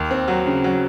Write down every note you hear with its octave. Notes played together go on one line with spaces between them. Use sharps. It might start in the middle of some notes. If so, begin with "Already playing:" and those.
Already playing: D#2
C4
F#3
C#3
F#3